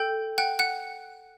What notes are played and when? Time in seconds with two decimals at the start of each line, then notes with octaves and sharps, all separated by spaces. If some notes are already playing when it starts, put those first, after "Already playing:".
Already playing: A4 G5 G6
0.38 F#5 G5 F#6
0.59 F#5 F#6